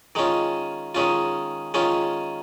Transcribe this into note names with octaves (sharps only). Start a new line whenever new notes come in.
D#3 G#3 C#4 F4
D#3 G#3 C#4 F4
D#3 G#3 C#4 F4